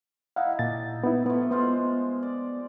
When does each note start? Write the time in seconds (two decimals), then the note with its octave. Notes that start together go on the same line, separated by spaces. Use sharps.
0.36 D#4 E4 F5 F#5
0.59 A#2 G4 A5 A6
1.04 B3 D#4 E4
1.26 F3 A3 B3
1.51 G#3 B3 F4 C5
2.23 D5